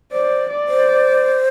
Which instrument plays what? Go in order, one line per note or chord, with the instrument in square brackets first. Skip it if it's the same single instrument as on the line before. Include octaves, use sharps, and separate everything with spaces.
[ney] C5 [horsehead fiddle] D5
[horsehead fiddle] D5
[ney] C5